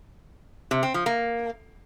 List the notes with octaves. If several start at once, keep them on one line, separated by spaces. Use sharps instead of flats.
C3
C4
F3
A#3